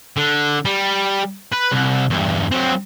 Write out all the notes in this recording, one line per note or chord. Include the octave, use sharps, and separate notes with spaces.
D3
G3
B4
C2
E2 G2
F#3 C4